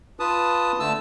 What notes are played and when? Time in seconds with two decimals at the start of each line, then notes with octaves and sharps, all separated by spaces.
0.20 F4 B4 A5 D#6
0.80 D3 A3 A5 E6